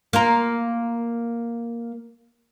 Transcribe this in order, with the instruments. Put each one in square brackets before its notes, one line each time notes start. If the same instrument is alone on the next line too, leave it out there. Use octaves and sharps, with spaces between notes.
[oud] A#3 F4 A#4